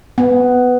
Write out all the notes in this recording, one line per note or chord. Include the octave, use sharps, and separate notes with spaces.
B3